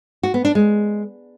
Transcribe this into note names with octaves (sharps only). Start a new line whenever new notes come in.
F#4
B3
D4
G#3